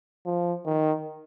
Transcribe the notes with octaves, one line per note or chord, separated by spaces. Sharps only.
F3
D#3